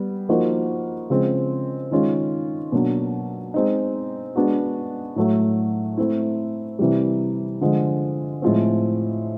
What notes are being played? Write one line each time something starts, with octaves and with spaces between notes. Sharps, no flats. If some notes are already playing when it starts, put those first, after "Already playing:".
Already playing: G3 B3
F3 A#3 D#4 F#4 A#4
C#3 F3 G#3 C4
D#3 G#3 C#4 F4
B2 F#3 A#3 D4
G#3 C4 D#4
G#3 B3 D4 F#4
A2 F#3 A3
A3 C4 E4
C3 E3 G3
D3 F3 G#3
A2 F3 G#3 C4